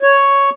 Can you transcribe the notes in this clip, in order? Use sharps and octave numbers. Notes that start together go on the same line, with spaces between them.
C#5